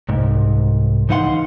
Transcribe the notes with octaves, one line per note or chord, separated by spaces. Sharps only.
C2 G#2
C#2 E3 D#4 F5 F#5 C6